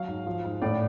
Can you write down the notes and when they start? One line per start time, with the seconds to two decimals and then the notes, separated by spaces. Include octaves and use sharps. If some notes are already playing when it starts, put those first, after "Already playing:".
Already playing: F#3 F5
0.08 G#2
0.26 F3
0.45 G#2
0.62 A2 D5